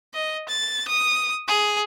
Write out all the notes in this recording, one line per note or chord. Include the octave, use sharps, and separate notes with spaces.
D#5
A6
D#6
G#4